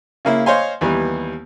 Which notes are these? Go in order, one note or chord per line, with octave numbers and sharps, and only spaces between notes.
C#3 A#3 E4
C5 C#5 D#5 F5 G#5 C6
D#2 E3 G3 B3